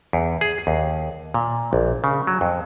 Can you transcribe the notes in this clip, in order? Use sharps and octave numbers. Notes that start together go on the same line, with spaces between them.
E2
G#4
D#2
A#2
A#1
C#3
F#3
F2